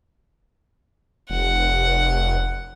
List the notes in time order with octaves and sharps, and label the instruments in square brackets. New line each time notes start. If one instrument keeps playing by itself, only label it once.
[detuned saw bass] F1 [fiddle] F#5